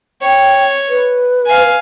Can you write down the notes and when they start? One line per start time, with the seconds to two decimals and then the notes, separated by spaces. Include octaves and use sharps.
0.22 C#5 G5
0.89 B4
1.46 F5 G#5